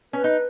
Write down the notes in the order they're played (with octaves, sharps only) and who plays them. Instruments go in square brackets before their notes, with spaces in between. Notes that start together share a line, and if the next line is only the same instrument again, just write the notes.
[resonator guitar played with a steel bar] C#4 [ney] B4
[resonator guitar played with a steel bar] D#4